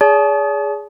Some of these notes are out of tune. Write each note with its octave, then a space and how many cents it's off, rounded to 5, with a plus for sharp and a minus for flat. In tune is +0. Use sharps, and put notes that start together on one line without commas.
G#4 +0 D5 -45 A5 -35